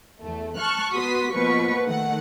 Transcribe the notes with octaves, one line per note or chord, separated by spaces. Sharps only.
E2 A3
A5 C#6 F6 F#6
B3 F#4 B4 C6 D#6 B6
B2 F3 A#3 B4 C#6
D#3 A3 F#5